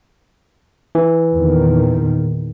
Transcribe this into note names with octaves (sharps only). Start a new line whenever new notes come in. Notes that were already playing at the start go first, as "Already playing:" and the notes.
E3
E2 A#2 D#3